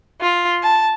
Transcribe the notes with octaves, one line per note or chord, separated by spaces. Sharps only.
F4
A5